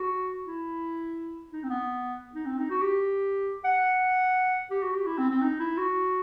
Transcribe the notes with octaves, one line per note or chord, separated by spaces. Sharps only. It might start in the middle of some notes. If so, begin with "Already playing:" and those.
Already playing: F#4
E4
D#4
C4
B3
D#4
C4
D#4
F#4
G4
F#5
G4
F#4
G4
E4
C4
C4
D#4
E4
F#4